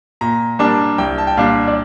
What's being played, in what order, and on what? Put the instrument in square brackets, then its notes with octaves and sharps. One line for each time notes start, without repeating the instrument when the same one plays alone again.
[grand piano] A#2 A#5
G3 A#3 D4 A5
C2 G5
A5
G5
A#2 G3 D4 F5
D5